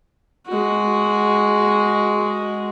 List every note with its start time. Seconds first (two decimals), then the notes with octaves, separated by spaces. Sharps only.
0.47 G#3 F#4